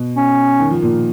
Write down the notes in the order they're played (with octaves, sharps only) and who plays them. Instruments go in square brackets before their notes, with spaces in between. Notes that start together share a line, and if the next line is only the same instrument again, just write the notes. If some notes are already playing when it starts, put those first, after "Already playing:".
Already playing: [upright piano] B2
[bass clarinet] C#4
[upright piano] D#3
F3
A#2